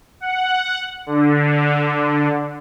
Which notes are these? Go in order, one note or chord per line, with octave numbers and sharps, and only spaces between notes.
F#5
D3